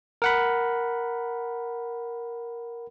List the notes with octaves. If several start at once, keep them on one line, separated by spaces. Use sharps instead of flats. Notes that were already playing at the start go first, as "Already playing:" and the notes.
A#4 F#5 B5